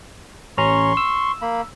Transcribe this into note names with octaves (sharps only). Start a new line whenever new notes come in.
A1 C#4 A#5 C6 C#6
E6
A#3 B5